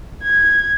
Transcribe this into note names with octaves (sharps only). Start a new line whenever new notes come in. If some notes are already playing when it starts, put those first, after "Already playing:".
G#6